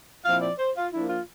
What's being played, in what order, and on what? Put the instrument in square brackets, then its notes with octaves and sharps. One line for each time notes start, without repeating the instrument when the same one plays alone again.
[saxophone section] A#2 F3 C4 E4 F5
D5
C5
F4
F3 A#3 D4 E4
F4